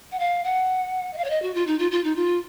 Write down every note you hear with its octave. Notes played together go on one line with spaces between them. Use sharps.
F#5
F5
F#5
D#5
F5
C#5
D#5
F#4
F4
D#4
F4
F4
D#4
F4